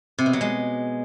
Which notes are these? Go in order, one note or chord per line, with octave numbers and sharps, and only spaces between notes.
C3
B2
F#3
G#3